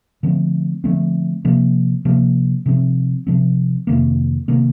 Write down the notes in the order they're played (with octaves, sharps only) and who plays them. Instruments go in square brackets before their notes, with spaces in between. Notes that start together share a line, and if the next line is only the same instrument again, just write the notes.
[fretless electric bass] D3 F3 A3 C4
D3 F3 A3 C4
C3 F3 A#3
C3 F3 A#3
C3 F3 C4
C3 F3 C4
F2 C3 D#3 A#3
C3 D#3 A#3